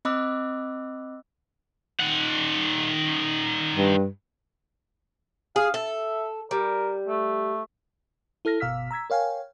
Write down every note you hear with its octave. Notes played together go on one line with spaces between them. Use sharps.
C4 D#5 B5 D6 E6 F#6
D#3 F#5
G2
G#4 F5
A4 E5
G3 A#4
A3
E4 A4 F6 A#6
G1 B2 F5 E6 F6 B6
A#5 E6 G#6 B6
A#4 C#5 F5 G5 G#5